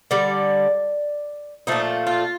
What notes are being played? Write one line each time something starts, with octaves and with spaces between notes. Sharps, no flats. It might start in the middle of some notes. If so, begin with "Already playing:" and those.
D3 G3 D5
A#2 F3 A3 D#4
F4